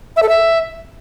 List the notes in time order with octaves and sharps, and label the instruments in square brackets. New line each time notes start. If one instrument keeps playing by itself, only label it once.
[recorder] E5
A4
E5